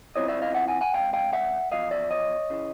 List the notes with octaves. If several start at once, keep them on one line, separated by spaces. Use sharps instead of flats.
C#3 F3 G#3 C4 E4 C#5 D#5
D5 E5
D#5 F5
E5 F#5
F#5 G#5
F#5 G#5
C#2 C3 F5 G5
F5 G5
E5 F#5
E2 C3 F3 D#5 F5
D5 E5
C#5 D#5
C#3 E3